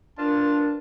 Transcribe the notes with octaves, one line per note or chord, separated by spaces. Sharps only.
D4 F4 A#4 B4 A5